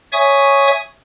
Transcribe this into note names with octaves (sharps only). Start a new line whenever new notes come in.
C#5 E5 G#5 C#6 D#6